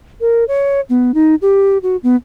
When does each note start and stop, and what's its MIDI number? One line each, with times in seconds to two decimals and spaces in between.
0.21 0.44 70
0.48 0.81 73
0.90 1.14 59
1.14 1.35 63
1.42 1.78 67
1.83 1.97 66
2.03 2.16 59